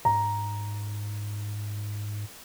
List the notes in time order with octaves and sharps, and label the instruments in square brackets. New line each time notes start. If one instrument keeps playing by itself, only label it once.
[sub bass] G#2 [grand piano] A#5